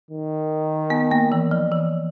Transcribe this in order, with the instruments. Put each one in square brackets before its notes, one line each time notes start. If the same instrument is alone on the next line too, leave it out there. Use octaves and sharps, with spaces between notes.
[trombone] D#3
[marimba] B3
A#3
E3
F3
E3